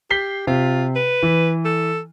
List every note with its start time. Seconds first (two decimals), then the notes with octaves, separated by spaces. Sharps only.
0.10 G4 B6 C7 G7
0.47 C3 F4
0.96 B4
1.23 E3
1.65 A4